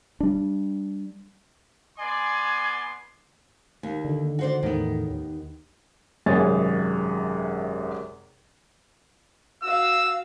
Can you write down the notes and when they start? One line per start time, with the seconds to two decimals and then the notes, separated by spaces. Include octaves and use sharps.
0.20 G3 D4
1.98 B3 D5 G#5 C6
3.83 D#2
4.04 D3 D#3
4.39 F#4 C5 D5
4.63 E2 A2 D#3 B3
5.10 D#2
6.26 G#1 F#2 C3 G#4 C#5 A6
9.63 F#4 F5 E6